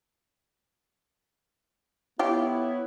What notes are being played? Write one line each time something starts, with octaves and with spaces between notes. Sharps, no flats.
B3 E4 F4 G4 C#5